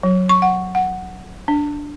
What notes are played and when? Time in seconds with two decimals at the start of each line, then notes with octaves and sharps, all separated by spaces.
0.03 F#3
0.29 C#6
0.42 F#5
0.75 F#5
1.48 D4